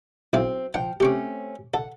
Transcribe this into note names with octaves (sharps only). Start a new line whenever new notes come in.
B1 C4 E4 F5
F3 F#5 G5
A3 C4 C#4 G4 C#6 D6
A4 F#5